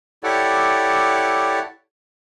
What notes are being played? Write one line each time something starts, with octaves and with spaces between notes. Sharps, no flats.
E4 G4 A4 C#5 D5 F#5